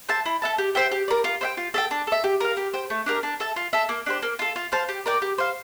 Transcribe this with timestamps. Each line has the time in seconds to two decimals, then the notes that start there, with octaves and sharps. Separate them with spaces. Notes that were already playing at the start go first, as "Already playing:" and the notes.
0.09 C5 E5 A5
0.26 E4
0.42 A4 E5 A5
0.58 G4
0.75 C5 E5 G5
0.91 G4
1.08 A#4 D5
1.24 F4
1.41 C5 E5 G5
1.57 F4
1.74 A4 E5 G5
1.91 D4
2.07 A4 E5
2.24 G4
2.41 A#4 F5
2.57 G4
2.73 C5 G5
2.90 A3
3.06 D4 G4 A#4
3.23 D4
3.40 A4 E5 A5
3.56 F4
3.73 A4 E5
3.89 A#3
4.06 D4 G4 C5
4.22 A#3
4.39 F4 A4
4.56 F4
4.72 C5 F5 A5
4.89 G4
5.06 A#4 D5 G5
5.22 G4
5.38 C5 F5